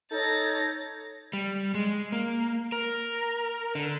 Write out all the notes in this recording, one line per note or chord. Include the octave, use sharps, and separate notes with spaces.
D#4 A4 C#5 G6 A6 A#6
G3
G#3
A#3
A#4
D3